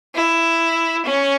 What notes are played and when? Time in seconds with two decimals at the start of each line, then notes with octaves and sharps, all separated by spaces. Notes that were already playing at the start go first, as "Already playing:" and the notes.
0.15 E4
1.05 C#4